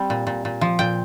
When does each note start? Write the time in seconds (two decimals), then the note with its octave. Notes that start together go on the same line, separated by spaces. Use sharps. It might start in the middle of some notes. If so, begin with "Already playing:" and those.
Already playing: G3 C4
0.10 A#2
0.27 A#2
0.45 A#2
0.61 F3
0.79 A#2 G5